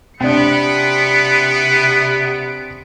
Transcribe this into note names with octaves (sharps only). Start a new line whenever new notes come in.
C3 B3 C4 D4 C#7 D7